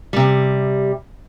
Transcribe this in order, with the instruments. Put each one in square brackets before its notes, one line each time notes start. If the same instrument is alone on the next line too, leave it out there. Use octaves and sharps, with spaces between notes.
[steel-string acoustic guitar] C3 G3